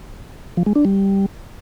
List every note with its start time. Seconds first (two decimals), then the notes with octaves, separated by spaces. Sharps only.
0.57 F3
0.66 G#3
0.76 D4
0.85 G3